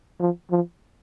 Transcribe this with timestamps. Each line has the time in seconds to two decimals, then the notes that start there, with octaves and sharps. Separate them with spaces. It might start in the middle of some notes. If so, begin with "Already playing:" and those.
0.20 F3
0.51 F3